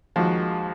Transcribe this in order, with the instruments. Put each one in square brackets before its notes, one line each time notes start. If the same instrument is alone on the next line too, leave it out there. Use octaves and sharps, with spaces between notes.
[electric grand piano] D#2 D#3 G#3 D#4 F#4 [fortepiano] F3